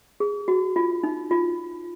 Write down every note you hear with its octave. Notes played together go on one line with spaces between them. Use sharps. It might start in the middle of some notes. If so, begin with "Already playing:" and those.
G#4
F#4
F4
D#4
F4